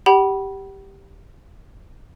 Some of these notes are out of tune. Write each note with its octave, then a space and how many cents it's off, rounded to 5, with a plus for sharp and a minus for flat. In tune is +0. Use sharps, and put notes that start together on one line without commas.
G4 +0 F#5 +45 B5 -20